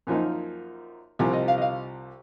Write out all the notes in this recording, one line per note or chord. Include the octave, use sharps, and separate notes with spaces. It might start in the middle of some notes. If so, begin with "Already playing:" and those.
F#2 F3 A#3 D#4 G#5
C2 C3 F3 G#5
D#5
F5
D#5
F5